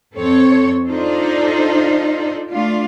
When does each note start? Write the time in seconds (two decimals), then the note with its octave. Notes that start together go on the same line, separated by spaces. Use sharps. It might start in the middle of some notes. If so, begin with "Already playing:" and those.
0.16 F2 C4 A4 C#5
0.86 D4 D#4 F4 A4 C5
2.50 A3 D4 F4